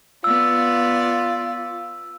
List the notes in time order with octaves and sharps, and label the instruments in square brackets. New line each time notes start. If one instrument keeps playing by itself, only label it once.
[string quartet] B3 D5 [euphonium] F4 [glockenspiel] E6